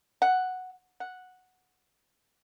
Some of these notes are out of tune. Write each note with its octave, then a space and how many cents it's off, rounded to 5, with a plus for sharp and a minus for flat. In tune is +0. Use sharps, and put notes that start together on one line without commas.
F#5 +0
F#5 -5